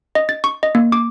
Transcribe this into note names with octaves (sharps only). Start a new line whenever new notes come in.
D#5
A6
C#6
D#5
A#3
D6